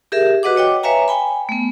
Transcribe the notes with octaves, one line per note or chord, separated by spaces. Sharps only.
G4 G#4 A#4 E5
F#4 B4 D#5 F#5 D6
C#5 D#5 G5 D6
B4 C#5 E5 F5 G#5 A#5
G5 G#5 B5
A3 B3